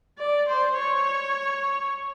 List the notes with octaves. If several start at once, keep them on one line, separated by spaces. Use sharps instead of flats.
D5
C5
C#5